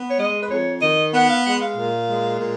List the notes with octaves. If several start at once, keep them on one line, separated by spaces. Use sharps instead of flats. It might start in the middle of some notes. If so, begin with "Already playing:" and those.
Already playing: B3
C#5
G#3 D#5
B4
F2 C#5
D#3 D#5
B3 F#5
F5
G#3 F#5
F5
A#2
G#3
A#2